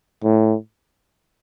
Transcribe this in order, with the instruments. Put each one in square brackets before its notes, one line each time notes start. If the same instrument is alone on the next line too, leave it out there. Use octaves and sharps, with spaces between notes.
[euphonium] A2